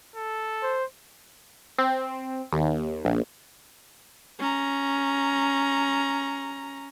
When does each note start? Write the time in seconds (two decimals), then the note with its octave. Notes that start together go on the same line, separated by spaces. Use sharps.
0.16 A4
0.63 C5
1.78 C4
2.53 D#2
3.05 A#1
4.39 C#4 A#5